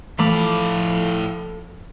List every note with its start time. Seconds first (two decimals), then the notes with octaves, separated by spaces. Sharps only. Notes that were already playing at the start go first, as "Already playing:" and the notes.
0.19 A2 E3 F3 A3 A4 F5 B5 D6